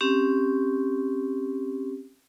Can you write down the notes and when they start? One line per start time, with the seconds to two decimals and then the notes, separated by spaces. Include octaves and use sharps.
0.01 C4 C#4 G4